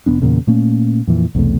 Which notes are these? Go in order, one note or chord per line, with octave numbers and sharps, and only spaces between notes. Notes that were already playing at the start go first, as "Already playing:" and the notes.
F1 G2 B3 D4
E2 A#2 C#3
A#2 A3 A#3 C#4
F2 A#2 E3
B1 E2 C3 A3